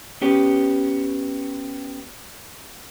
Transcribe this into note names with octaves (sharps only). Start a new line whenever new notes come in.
B3 C#4 G4